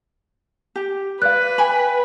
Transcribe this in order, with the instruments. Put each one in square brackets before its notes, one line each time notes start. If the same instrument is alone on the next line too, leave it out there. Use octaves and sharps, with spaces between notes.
[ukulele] G4
[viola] B4 [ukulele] D5 [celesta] F5 F#6
[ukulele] G5 G#5 B5